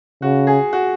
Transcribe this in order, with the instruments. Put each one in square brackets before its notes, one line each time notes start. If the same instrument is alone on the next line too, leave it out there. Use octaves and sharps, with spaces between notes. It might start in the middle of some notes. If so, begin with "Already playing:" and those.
[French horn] C#3 [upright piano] F#4
[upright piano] G#4
F#4